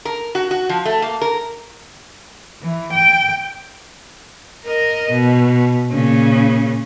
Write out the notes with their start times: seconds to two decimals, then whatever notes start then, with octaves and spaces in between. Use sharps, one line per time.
0.05 A#4
0.35 F#4
0.51 F#4
0.69 F3
0.85 A3
1.02 A#3
1.22 A#4
2.62 E3
2.93 G5
4.65 A#4 D#5
5.11 B2
5.91 A#2 C#3